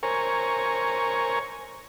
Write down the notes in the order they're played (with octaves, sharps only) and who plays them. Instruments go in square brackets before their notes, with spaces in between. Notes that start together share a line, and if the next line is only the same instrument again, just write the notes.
[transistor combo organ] A#4 C5 C#5 G#5 A#5 C#6